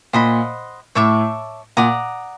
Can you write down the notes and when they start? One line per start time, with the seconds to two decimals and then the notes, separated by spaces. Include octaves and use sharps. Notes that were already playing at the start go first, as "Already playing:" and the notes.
0.13 A#2 C5 D#5 F#5 B5
0.95 A2 C#5 E5 A5 D6
1.77 A#2 D5 F#5 A#5 D#6